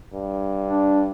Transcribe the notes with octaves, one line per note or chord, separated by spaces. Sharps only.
G2
D4